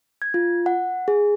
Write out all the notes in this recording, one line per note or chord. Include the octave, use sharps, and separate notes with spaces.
G#6
F4
F#5
G#4